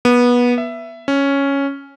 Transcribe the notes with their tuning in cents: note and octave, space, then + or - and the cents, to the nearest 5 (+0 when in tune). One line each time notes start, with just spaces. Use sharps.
B3 -20
E5 +15
C#4 +0